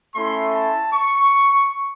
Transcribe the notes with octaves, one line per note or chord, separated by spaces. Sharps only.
A3 C#4 E4 C6
A5
C#6